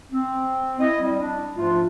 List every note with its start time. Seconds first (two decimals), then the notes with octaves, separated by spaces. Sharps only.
0.12 C4
0.80 E4 D#5
1.01 G3
1.20 D4
1.56 G#2 F3 A3 D4 F4